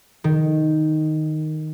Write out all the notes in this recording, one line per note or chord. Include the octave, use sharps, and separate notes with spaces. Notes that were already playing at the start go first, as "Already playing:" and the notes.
D#3